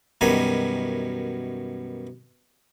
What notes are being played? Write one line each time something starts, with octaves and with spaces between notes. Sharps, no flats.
F#2 B2 D#3 G3 G#5